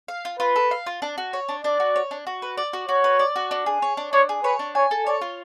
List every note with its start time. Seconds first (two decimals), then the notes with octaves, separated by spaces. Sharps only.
0.08 F5
0.25 F4
0.39 F4 B4
0.56 A4
0.71 F5
0.86 F4
1.02 D4
1.18 F#4
1.33 C#5
1.49 D4
1.64 D4 D5
1.80 F#4
1.96 C#5
2.11 D4
2.27 F#4
2.42 B4
2.57 D5
2.73 F#4
2.89 F#4 C#5
3.04 B4
3.19 D5
3.36 F#4
3.51 D4
3.66 G#4
3.82 C#5
3.97 D4
4.13 D4 C#5
4.29 G#4
4.44 B4 C#5
4.59 D4
4.75 C#5 G#5
4.91 A4
5.06 C#5 D5
5.21 F4